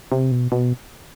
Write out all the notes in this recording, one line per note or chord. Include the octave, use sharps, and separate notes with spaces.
C3
B2
B2